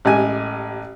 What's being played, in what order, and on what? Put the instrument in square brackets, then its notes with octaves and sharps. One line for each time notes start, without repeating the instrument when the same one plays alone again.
[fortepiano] A1 G#3 G4 G#5